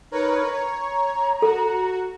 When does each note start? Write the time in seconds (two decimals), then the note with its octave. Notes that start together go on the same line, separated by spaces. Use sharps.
0.12 D#4 A#4 B4 C#5
0.52 C#5 A#5
1.42 F#4 A4